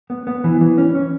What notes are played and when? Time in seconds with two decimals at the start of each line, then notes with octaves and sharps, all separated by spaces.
0.10 B3
0.27 B3
0.44 E3
0.61 E3
0.78 C#4
0.95 C#4